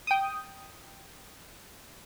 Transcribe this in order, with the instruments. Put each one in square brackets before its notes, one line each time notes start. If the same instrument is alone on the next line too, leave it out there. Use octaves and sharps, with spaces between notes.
[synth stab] G5 D#6